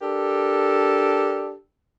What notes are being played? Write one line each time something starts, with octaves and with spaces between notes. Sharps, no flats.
D4 G4 A4 A#4